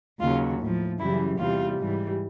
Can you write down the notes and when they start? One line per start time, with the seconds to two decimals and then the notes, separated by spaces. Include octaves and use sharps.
0.20 D#2 C#3 F#3 F4
0.59 A2 F3
0.99 F#2 C#3 E3 G3 E4
1.38 E2 C3 E3 G3 F4
1.78 G#2 E3 G3